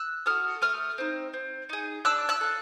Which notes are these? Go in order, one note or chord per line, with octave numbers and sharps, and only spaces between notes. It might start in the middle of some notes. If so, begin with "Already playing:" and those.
Already playing: E6 F#6
F#4 A4 D#6 F6
A3 D#6 F6
C4 D#4
C4
D#4 G#4
D4 E6 F#6
E6 F#6
F4 A4